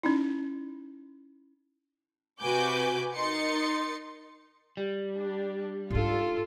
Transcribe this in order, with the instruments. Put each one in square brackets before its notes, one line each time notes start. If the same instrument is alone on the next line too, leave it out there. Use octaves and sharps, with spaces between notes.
[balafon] C#4 D#4 E4
[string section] C3 F#4 B4 G#5 D6 G6
D#4 A#4 C6 A6 C#7
[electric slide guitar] G3
[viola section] D4
[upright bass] G#2 D4 [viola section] F4 A4